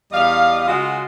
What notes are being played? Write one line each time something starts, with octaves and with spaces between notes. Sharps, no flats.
E2 G3 D#5 F5
C#3 G#3 F4 F#4